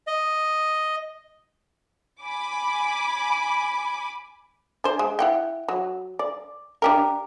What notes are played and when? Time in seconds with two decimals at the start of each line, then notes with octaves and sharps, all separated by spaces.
0.07 D#5
2.23 G#5 B5 D6
4.84 D4 C5
4.99 G#3
5.19 E4 F#5 G5
5.68 F#3
6.19 D5
6.82 D4 G4 A#4